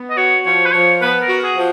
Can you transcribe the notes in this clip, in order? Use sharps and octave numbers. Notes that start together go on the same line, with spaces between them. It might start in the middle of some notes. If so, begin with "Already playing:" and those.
Already playing: B3
D#5
F#4 C#5
F3 C#5
B4
F3 C#5
B3 B4
A#4
F#4
G#4
F3